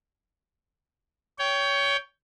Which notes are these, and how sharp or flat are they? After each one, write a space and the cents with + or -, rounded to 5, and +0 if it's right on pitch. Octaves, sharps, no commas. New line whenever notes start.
C#5 +20 G5 +0